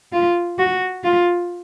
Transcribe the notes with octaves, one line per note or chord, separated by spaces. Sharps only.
F4
F#4
F4